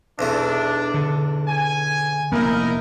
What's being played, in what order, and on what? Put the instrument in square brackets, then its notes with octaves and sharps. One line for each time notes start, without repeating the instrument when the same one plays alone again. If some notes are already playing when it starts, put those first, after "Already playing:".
[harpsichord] B1 E2 E3 [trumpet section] D4
[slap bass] D3
[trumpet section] G#5
[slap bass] F1 A#3 B3 [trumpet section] D#4 E4 A#4